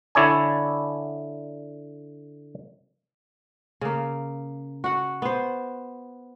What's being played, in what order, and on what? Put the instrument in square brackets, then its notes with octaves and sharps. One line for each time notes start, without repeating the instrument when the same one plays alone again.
[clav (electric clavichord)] D3 E4 C#5 D5 G#5
[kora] C#3 A#3
F#4 F#5
B3 C5